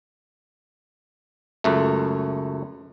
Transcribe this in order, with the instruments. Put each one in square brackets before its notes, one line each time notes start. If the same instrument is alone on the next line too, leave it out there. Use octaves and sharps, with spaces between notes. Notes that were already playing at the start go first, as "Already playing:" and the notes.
[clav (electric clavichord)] C#2 F#2 A3